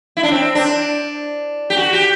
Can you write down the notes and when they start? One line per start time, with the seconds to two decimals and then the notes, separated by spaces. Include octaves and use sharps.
0.17 E4
0.23 D4
0.32 C4
0.55 D4
1.70 G4
1.77 F#4
1.93 G4